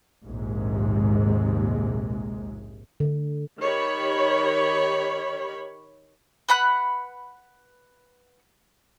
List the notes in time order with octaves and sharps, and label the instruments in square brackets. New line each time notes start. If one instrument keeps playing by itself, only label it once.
[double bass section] A#1 D#2 G#2 C3 G#3
[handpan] D3
[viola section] D#3 G4 C#5 B5
[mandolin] B4 F#5 B5 F#6